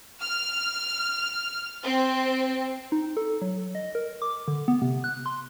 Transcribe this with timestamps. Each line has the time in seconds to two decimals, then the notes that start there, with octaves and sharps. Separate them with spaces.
0.20 F6
1.84 C4
2.92 D#4
3.17 A4
3.42 F#3
3.75 D#5
3.95 A#4
4.22 D6
4.48 D3
4.68 B3
4.82 C3
5.04 F#6
5.26 C6